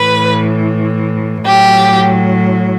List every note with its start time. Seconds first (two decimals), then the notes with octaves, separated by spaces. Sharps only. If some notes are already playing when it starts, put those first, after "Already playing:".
Already playing: A2 E3 B4
1.46 A2 F#3 G4